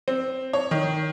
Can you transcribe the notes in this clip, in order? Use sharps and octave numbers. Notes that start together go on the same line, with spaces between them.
C4
C#5
D#3